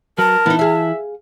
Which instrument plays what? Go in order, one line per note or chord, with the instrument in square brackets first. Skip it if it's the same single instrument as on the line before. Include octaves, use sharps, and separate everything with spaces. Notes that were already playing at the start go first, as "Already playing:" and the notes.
[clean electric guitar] F#3 F#4 B4 [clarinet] A#4 [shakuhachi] A5
[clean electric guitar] E3 E4 [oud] B3 D#4
[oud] G#4 F5 [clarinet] E5